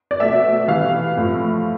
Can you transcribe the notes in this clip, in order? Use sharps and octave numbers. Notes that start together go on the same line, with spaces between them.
D5
B2 A3 E5
C3 E3 B3 F5
A2 F3 A3